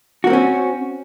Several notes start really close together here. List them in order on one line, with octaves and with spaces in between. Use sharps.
F#4 A#3 C4 C#4